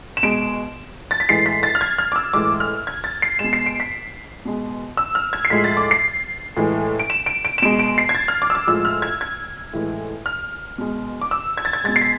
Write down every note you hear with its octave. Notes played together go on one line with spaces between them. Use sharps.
E7
B2 G#3 D7
A6
B6
A2 E3 G#3 C7
B6
A6
F6
G#6
F6
D6
E6
A2 E3 G#3 D6
F6
G#6
A6
C7
B2 G#3 E7
C7
D7
B6
B2 G#3
E6
F6
G#6
C7
A2 F3 G#3 B6
A6
D6
C7
A2 E3 G#3
D7
E7
D7
D7
E7
B2 G#3 D7
D7
C7
G#6
A6
F6
D6
E6
D6
A2 F3 G#3 E6
F6
G#6
G#6
A2 E3 G#3
F6
B2 G#3
D6
E6
G#6
A6
G#6
B2 G#3 A6
C7
B6